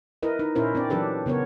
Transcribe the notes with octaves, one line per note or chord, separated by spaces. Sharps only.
E4 A#4 B4 D#5
D#4
A#2 C#4 E4 A#4 C5
C4 D4 D5
E3 F#3 D4 G4 A4 B4
C#3 B3 A#4 C#5